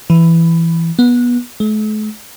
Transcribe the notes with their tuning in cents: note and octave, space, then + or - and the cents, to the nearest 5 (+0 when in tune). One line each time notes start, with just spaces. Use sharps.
E3 +10
B3 -20
A3 -45